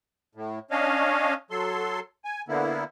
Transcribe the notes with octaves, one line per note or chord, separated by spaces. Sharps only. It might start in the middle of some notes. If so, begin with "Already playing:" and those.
A2
C#4 D4 C#5 D#5 F5
F#3 A4 C6
G#5
D3 A#3 B3 E4